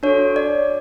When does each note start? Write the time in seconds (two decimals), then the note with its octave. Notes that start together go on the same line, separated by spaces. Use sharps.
0.03 D4 F#4 A4 C#5
0.36 D5